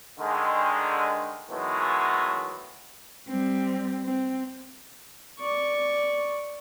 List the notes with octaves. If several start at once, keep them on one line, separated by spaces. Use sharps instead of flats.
D3 D#3 G#3
D#3 E3 F#3 G#3 A3 B3
G3 C4
C4
D5 C#6